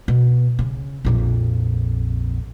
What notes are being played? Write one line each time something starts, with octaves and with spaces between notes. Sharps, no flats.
B2
C#3
A#1 F2